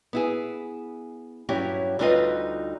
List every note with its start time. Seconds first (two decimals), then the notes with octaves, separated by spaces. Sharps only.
0.13 B3 E4 G#4
1.49 G2 F#3 C#4 E4 G4
1.99 D2 G3 D#4 F4 B4 D#5